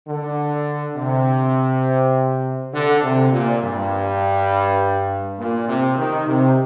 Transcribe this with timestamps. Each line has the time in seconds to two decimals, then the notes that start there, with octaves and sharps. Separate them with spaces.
0.08 D3
0.96 C3
2.73 D3
3.03 C3
3.32 A#2
3.62 G2
5.38 A#2
5.68 C3
5.97 D#3
6.27 C3